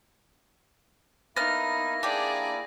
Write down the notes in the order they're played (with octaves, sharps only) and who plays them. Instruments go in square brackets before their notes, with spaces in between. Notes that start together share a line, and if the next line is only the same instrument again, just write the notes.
[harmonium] A#3 E4 [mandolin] B3 F6 [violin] D#4 [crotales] A#6
[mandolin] D4 G4 [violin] G#4 D5